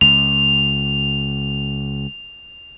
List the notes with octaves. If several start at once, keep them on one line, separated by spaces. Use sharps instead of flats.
C#2 F7